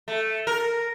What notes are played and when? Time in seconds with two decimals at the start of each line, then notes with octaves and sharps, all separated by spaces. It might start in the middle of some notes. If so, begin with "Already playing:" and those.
0.08 A3
0.47 A#4